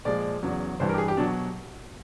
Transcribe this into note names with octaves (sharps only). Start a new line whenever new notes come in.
A#2 F3 G#3 D5
E2 C#3 F#3
G2 E3 G3 C5
A#4
G4
G#4
G4
B2 F#3 D4